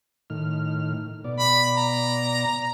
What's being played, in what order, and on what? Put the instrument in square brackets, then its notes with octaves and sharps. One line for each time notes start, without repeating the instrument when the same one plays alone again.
[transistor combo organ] A2 D#3 F6
B2 D5
[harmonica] B5
A#5